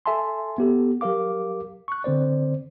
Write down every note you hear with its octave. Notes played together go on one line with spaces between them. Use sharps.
A4 E5 G#5 A5 C6
B3 G4 A4
F#3 G4 A#4 F5 D6
C#6 F#6
D3 C4 C5 D5